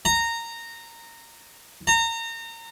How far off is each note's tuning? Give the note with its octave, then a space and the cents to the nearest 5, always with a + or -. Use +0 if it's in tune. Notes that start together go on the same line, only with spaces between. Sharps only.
A#5 -15
A#5 -30